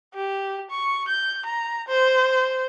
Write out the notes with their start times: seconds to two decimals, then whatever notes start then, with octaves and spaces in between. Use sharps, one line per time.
0.14 G4
0.70 C#6
1.08 G6
1.45 A#5
1.88 C5